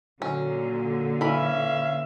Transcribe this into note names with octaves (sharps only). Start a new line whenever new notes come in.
A#2 D3 F#3 C#4
E3 C#4 E5 F5 B5